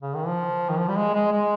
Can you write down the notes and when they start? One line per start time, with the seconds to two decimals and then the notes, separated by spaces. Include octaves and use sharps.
0.01 C#3
0.14 D#3
0.27 F3
0.69 D#3
0.79 F3
0.88 G3
0.97 G#3
1.14 G#3
1.32 G#3